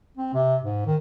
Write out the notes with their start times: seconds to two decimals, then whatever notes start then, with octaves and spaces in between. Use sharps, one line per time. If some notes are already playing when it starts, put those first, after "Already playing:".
0.17 C4
0.34 C3
0.63 G#2
0.86 D#3